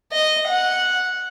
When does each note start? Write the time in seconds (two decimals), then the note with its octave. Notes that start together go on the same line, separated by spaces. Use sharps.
0.12 D#5
0.48 F#5